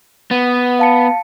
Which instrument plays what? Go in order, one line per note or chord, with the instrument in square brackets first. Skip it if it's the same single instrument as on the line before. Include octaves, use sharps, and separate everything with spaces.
[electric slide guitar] B3
[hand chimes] F5 A5 C#7